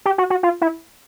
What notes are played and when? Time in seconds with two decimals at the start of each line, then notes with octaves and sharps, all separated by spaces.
0.06 G4
0.18 F#4
0.30 F#4
0.43 F4
0.61 E4